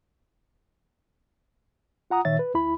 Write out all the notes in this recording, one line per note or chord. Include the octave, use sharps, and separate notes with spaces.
F4 F#5 A#5 D#6
A#2 D#3 C#5 E5 A6
B4
D2 E4 B5